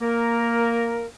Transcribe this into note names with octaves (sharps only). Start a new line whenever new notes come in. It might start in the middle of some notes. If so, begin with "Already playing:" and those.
A#3 A#4